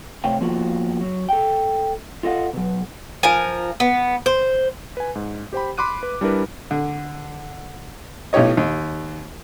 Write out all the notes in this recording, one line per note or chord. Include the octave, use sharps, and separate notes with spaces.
C3 A3 C#5 F5 G5
F3 A#3 B3 F4 F#4
F#3
A4 G5
F4 A4 D#5 F5 F#5
B2 F#3
F3 A#4 G#5
B3
C5
B4 G#5
G#2
G4 C5 G5 B5
B5 C6 D6 F#6 D#7
B4
G3 D4 E4 A#4 B4
D3
B1 A2 G4 C#5 D#5
D#2